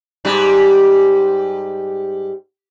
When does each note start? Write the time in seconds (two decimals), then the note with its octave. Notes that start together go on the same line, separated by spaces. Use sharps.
0.25 G#2 G3